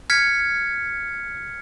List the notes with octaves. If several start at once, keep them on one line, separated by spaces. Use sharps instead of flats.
F6 G#6 B6 C#7